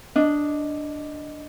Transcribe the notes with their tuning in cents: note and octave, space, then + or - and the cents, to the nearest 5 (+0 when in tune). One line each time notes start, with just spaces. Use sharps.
D4 +0 D#5 +0